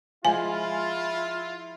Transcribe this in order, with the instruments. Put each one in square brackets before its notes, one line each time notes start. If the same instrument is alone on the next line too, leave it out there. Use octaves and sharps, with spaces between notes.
[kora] F3 G#3 [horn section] E4 F4 [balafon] G#5